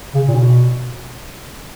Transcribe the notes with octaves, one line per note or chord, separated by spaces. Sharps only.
C#3
A#2
B2